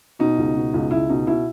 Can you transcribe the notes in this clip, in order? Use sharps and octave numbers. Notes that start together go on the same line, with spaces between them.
B2 D#4
C#2
B2
C#2
C#2 E4
B2 D#4
B2 E4